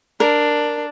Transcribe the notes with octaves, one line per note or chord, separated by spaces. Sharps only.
D4 A#4